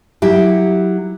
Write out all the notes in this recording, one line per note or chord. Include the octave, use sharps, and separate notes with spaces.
F#3 E4 G4